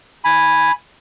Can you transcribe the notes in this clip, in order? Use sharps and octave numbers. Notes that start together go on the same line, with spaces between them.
G#5 B5